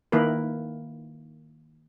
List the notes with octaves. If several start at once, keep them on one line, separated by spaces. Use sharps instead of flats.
D#3 A#3 E4 A#4 B4